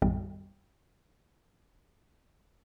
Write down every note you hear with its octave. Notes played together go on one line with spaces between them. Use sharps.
B1 F#2 A2 D#3 G3